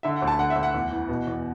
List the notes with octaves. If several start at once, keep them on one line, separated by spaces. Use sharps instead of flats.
D3 E5
F#5
D2
A5
D3 F#5
E5
D2
F#5
E2
E3
B2
E2